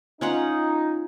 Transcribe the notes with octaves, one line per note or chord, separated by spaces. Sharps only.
C#4 D#4 F4 F#5